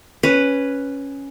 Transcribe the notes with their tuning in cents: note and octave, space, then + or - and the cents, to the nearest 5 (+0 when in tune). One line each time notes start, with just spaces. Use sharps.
C#4 +0 B4 +0